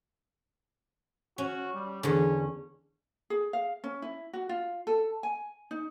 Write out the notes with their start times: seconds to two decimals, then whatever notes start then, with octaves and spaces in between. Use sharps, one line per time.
1.38 C#4 F#4
1.74 G3
2.03 E2 D3 C#4
3.30 G#4
3.53 F5
3.84 C#4
4.02 E4
4.33 F#4
4.49 F4
4.87 A4
5.23 G#5
5.71 D#4